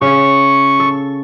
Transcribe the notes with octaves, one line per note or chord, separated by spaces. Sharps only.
C#3 C#6
A4